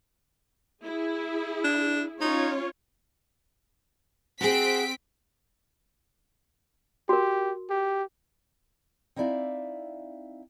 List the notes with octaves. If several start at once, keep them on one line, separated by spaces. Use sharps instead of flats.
E4 G#4
D4
C#4 D#4 F4 C#5
C4 F#4 G#4 B6 D7
F#4 G4 A#4
G4
C4 D#4 E4 D5 E5 F5